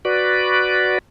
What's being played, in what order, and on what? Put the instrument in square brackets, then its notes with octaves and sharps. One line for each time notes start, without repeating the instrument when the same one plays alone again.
[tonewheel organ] F#4 B4 D5